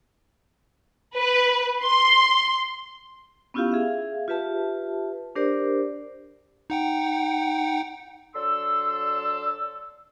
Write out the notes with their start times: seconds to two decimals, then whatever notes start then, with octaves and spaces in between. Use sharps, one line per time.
1.16 B4
1.84 C6
3.54 B3 C#4 E4 F4 G4 F5
3.72 G#4 E5 F5
4.28 F4 G4 B4 E5 A5
5.35 D4 G4 A#4 C5 D5
6.70 D#4 F#5 G5
8.35 F#3 D4 A4 C6 E6